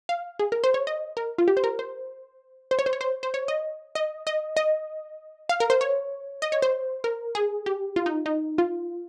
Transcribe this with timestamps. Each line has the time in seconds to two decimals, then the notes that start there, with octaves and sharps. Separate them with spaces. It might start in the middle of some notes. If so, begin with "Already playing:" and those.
0.09 F5
0.39 G#4
0.52 A#4
0.64 C5
0.74 C#5
0.87 D#5
1.17 A#4
1.38 F4
1.48 G4
1.57 C5
1.64 A#4
1.79 C5
2.71 C5
2.79 C#5
2.86 C5
2.93 C#5
3.01 C5
3.23 C5
3.34 C#5
3.48 D#5
3.95 D#5
4.27 D#5
4.57 D#5
5.49 F5
5.60 A#4
5.70 C5
5.81 C#5
6.42 D#5
6.52 C#5
6.62 C5
7.04 A#4
7.35 G#4
7.66 G4
7.96 F4
8.06 D#4
8.26 D#4
8.58 F4